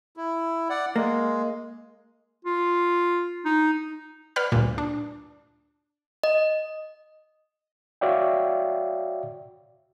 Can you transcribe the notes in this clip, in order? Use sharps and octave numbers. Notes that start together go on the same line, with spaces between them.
E4
D5 F#5
G#3 A#3
F4
D#4
B4 D5 F#5 B5 F6 G6
D2 G2 A#2
D4
D#5
F#4 C#5 D5 E5 F5 G5